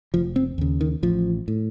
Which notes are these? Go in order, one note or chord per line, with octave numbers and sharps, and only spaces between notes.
F1 F3
C4
D#2 C#3
D#3
A1 F3
A2